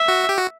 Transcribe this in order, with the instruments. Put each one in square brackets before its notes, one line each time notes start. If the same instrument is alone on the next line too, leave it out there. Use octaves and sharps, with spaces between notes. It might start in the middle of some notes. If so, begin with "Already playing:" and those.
Already playing: [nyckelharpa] E5
[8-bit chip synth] F#4
G4
F#4